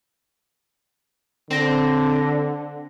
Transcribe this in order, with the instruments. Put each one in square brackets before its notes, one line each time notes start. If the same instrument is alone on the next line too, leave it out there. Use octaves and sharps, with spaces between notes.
[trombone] D3 [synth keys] C4 A#6